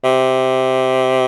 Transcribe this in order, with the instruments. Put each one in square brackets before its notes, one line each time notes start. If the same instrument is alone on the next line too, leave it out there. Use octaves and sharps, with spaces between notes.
[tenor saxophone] C3